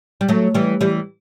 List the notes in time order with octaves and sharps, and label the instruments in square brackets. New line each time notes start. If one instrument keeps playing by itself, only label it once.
[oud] G3
F#3 A3
E3 G3
E3 G3